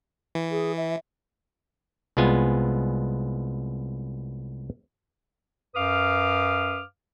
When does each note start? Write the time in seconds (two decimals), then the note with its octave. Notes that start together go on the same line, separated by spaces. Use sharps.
0.35 E3
0.51 G#4
0.77 E5
2.17 C2 G#3 B3 F4 G#5
5.75 F#2 B4 F5 D6 D#6 F6